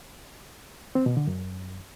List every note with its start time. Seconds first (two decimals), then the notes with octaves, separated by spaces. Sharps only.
0.95 C4
1.06 B2
1.17 D3
1.27 F#2